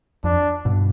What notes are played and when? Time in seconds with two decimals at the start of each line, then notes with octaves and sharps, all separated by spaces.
0.24 F2 D4
0.65 G2 B2